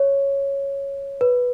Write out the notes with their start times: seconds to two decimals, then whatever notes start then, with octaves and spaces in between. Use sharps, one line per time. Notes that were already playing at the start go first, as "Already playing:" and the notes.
Already playing: C#5
1.21 B4